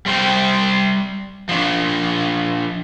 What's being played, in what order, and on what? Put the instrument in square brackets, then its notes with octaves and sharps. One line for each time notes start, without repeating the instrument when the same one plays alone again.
[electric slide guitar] G3 C5 G5
F3 D4